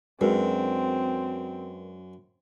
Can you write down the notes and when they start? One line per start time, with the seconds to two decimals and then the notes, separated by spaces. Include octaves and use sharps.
0.21 F#2 G#3 C4 D4 F#4 A#4 B4